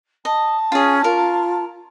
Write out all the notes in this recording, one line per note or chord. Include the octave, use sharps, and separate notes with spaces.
D#5 A5
C#4 F4 G#4
F4 A#4